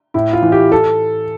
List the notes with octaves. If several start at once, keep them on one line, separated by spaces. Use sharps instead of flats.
A2 E4
F4
E3
G4
A4